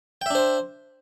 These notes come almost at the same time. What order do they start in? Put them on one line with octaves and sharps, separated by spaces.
G5 E5 D4 C5